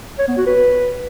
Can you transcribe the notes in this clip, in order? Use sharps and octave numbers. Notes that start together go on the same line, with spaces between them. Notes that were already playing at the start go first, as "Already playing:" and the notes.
C#5
B3
F#4
B4